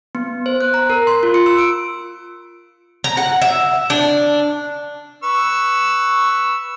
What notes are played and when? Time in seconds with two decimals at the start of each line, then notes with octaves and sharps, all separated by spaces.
0.15 B3
0.46 C5
0.61 F#6
0.74 A#5
0.90 A#4
1.07 C6
1.23 F4
1.34 C#7
1.46 E6
1.58 D7
3.04 A#5
3.17 F#5
3.42 E5
3.90 D4
5.23 B4 C#6 E6